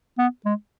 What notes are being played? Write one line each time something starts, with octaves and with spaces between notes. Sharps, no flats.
B3
G#3